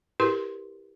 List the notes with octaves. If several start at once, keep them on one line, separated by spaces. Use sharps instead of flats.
E4 F#4 G4 A#4 B4 C6